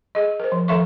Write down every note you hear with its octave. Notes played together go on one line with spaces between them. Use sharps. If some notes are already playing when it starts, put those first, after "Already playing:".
G#4 D#5
A#4 C5
F3
D#3 F3 A4 E5 F5 C#6